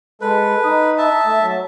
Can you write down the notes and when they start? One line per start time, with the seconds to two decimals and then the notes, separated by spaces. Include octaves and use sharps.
0.21 G#3 A4 B4
0.64 D#4 D#6
0.98 E5 A5
1.25 A3
1.42 F#3